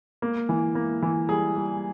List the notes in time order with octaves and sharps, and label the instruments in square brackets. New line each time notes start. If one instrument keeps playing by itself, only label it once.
[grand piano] A#3
E3
A#3
E3
G3 G#4
G3